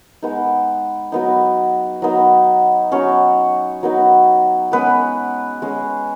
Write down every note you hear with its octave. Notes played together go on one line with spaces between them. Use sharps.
G#3 B3 D#4
F#3 B3 D#4
F#3 B3 D#4
F#3 B3 C#4 D#4 C#5
F#3 B3 D#4
G#3 B3 C#4 B4
G#3 C#4